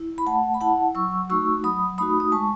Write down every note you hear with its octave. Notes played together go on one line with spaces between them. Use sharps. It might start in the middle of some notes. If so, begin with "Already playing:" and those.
Already playing: E4
B5
A3 F#5 A5
B5
E4 F#5 A5
F#3 C#6 E6
A3 D#4 F#4 C#6 E6
F#3 B5 D#6
A3 D#4 F#4 B5 D#6
D#6
G#3 A5 C#6